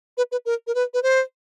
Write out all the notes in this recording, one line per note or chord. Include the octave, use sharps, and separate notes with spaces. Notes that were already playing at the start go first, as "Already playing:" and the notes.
B4
B4
A#4
A#4
B4
B4
C5